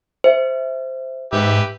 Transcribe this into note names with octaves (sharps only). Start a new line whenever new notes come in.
C5 E5
G#2 G4 B4 E5